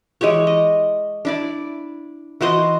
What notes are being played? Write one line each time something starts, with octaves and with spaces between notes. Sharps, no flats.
E3 G#3 G4 C#5
D#5
D4 E4 D5
E3 F#4 C5 D#5